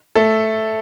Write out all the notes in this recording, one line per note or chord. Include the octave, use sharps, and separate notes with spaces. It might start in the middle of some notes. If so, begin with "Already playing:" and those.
A3 A4